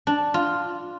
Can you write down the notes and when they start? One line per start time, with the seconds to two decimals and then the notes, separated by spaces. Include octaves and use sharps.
0.07 D4
0.34 F4